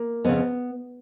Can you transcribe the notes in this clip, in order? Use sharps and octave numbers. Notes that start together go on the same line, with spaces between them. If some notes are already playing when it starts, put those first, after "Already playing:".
Already playing: A#3
F2 C#3 B3